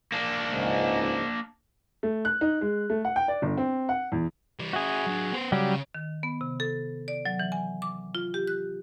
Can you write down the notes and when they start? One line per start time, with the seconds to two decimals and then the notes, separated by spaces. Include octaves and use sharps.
0.12 A#3 D4
0.51 C#2 G#2
2.03 A3
2.25 F#6
2.41 D#4
2.61 G#3
2.90 A3
3.05 F#5
3.16 G5
3.28 D5
3.42 G1
3.57 C4
3.89 F#5
4.12 E2
4.60 E3 G3
4.73 C#4 E4 F#4 G#4
5.06 F#3 D4
5.32 B3 C5
5.52 C#3 F#3 G3 G4
5.94 D#3
6.23 B3
6.41 C3
6.60 A4
7.08 D5
7.26 F#3
7.40 E3
7.52 G#5
7.82 D6
8.15 F4
8.34 G4
8.47 F#6